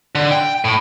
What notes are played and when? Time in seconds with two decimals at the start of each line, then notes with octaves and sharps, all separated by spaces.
0.15 D3
0.31 G5
0.64 A2